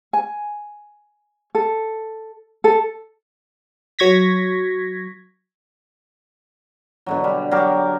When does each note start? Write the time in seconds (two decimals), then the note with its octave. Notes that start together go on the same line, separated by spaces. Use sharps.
0.13 G#5
1.55 A4
2.64 A4
3.99 F#3 C#6 G#6 A#6 B6
7.06 B2 D3 F#3
7.24 G3
7.51 F#3 G4 A#4 D5